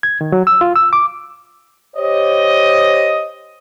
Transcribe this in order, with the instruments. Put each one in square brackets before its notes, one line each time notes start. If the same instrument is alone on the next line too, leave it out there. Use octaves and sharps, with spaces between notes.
[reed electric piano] G#6
D#3
F#3
E6
F4
E6
D6
[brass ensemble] G4 C5 C#5 D#5